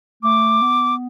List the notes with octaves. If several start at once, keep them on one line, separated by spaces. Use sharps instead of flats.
A3 D6
B3